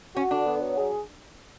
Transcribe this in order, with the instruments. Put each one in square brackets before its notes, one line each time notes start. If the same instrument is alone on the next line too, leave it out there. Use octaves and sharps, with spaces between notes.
[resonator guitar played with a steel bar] C#4 [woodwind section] F#4
[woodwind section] D3 [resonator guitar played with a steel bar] D4
[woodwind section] B3
F#3
G#4